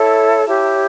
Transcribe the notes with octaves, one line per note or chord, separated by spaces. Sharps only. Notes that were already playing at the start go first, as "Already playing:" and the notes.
Already playing: E4 A4 C#5 A5
E4 G4 C#5